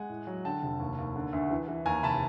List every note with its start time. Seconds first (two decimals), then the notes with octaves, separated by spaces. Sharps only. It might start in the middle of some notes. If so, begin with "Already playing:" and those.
Already playing: G#3 F#5 G#5
0.09 A2
0.27 F#3
0.45 D3 G5 A5
0.63 F1
0.80 D#2
0.98 D#2
1.16 D3
1.33 D2
1.50 E3
1.68 E3
1.85 D#2 G#5 A#5
2.03 F1 A5 B5